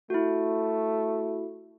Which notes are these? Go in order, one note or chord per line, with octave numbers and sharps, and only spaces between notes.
A3 E4 F#4